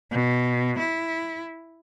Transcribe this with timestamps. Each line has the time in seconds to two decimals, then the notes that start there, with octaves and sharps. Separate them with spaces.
0.11 B2
0.79 E4